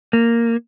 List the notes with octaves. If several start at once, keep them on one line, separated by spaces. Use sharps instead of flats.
A#3